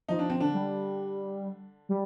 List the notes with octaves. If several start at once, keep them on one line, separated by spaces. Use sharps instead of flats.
F3 D#4
D4
C4
D3 D4
G3
G3